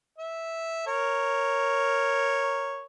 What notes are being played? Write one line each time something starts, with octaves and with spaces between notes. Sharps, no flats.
E5
A#4 C#5